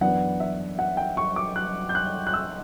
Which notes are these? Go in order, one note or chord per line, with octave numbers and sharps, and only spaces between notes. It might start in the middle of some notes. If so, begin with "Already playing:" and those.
F#2 E3 B3 D4 F#5
E5
F#5
G5
C#6
D6
F#6
G6
F#6
F#6
E6